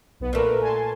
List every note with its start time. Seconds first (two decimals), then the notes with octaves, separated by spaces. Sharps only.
0.20 B1 B3
0.33 A#2 A3 A#4 B4
0.61 G#5 A5 C6